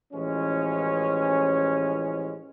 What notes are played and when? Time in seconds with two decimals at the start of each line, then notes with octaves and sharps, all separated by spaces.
0.13 A1 E3 F3 G#3 C#4